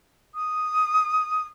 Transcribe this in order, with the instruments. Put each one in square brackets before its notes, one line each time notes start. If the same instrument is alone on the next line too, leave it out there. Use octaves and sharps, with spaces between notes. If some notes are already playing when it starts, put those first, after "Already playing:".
[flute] D#6